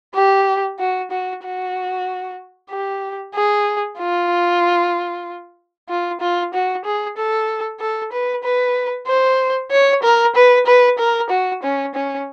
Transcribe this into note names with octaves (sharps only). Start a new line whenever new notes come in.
G4
F#4
F#4
F#4
G4
G#4
F4
F4
F4
F#4
G#4
A4
A4
B4
B4
C5
C#5
A#4
B4
B4
A#4
F#4
C#4
C#4